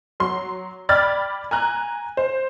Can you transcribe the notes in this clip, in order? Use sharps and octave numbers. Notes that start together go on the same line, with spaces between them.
F#3 C6
D5 G5 B5 F6 G#6 A6
G#5 A#5 F#6
C5